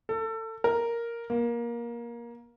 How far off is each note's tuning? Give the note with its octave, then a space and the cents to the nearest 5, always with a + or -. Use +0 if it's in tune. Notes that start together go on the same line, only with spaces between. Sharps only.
A4 +25
A#4 +0
A#3 +20